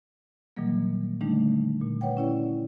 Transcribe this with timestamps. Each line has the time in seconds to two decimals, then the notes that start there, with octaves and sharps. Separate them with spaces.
0.57 A#2 D#3 E3 F#3 G3 A#3
1.21 D3 D#3 G3 A3 D4 D#4
1.81 A#2
2.01 B4 C#5 F#5 G5
2.17 C#4 E4 C#5 D5